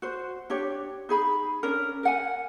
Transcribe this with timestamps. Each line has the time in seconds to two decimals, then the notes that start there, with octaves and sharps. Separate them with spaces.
0.02 F#4 C5
0.50 D4 G4 C#5
1.09 D#4 G#4 B5
1.63 C#4 D4 A#4
2.03 A#4 F#5 G#5